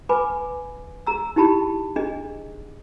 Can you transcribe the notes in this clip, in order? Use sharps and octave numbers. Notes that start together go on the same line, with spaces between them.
B4 G#5 B5 D6
G#4 A#5 E6
D#4 E4 G4 A5 B5
D4 G#4 D#5